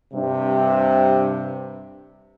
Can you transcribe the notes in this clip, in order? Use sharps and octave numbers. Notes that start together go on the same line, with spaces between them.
G2 C3